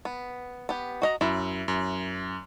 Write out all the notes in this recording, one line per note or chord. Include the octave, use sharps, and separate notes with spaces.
B3
B3 G4
F#4 D#5 A#5
F#2 E4
F#2